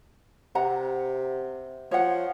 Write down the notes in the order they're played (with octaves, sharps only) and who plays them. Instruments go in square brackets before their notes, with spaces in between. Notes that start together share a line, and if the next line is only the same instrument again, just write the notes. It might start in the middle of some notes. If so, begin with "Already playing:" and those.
[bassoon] C3 [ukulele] F#5 A#5
[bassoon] F3 [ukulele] C#5 F#5